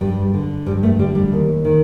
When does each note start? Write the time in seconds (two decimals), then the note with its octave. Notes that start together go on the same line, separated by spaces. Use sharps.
0.01 G2 G3
0.34 D3
0.66 G2 G3
0.83 A3
0.99 D3 G3
1.15 G3
1.32 D#2
1.65 D#3